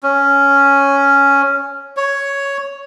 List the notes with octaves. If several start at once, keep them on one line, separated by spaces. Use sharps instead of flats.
C#4
C#5